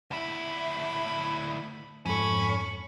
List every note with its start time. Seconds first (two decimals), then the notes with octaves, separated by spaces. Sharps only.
0.11 D2 E4 B5
2.06 F2 G#2 C#4 A4 B5 C#6